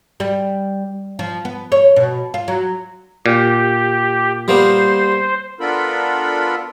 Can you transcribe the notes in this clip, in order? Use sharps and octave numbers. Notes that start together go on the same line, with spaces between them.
G3
F3
B3
C#5
B2
F4
F#3
A#2 G4
G3 A#3 B3 C5
B3 D4 F4 A4 A#4 B5